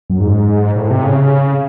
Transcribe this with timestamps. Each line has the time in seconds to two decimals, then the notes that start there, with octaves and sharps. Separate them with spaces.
0.10 F#2
0.20 G#2
0.76 A2
0.90 C3
1.04 C#3